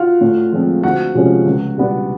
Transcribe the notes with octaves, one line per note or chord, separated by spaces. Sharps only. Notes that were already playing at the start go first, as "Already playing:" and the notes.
Already playing: F4 F#4 F5 F#5
A2
F3 G#3 C4
D2 F#4 F#5
C3 F3 G#3 C#4
C#2
B2 G3 B3 D4